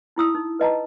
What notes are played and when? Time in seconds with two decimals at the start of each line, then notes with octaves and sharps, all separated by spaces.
0.16 D#4 E4 D#6 E6
0.35 D#4
0.59 B4 D#5 A5 A#5